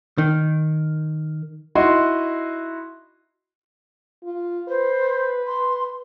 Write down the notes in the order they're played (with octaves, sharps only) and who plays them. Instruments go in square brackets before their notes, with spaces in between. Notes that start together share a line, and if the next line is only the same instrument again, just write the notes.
[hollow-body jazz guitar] D#3
[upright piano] D#4 E4 F#4 D#5 C6
[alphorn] F4
[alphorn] B4 [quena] C5
[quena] C6